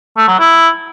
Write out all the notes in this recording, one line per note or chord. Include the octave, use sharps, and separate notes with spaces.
A3
F#3
E4